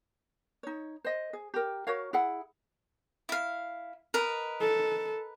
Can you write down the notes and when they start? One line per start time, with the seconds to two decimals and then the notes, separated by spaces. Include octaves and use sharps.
0.63 D#4 C#5
1.04 C5 D#5
1.33 G#4
1.54 G4 A#4
1.87 F#4 A#4 C#5 F5
2.13 E4 G#4 F#5
3.29 E4 F5
4.14 A#4 B4 D#5
4.60 A4